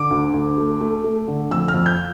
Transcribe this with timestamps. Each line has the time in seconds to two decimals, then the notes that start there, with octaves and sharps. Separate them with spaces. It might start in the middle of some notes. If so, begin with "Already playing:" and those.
Already playing: D3 D6
0.10 D2
0.34 D2
0.58 A3
0.81 A3
1.04 A3
1.27 D3
1.51 F2 E6
1.68 F6
1.74 F2
1.86 G6